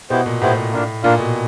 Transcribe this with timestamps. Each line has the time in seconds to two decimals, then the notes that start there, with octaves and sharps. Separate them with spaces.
0.10 B2 B3 E4 G4 C5
0.26 A#2
0.41 A2 B3 E4 G4 C5
0.72 A#3 D4 F4
1.03 A#2 A#3 D4 F4
1.19 B2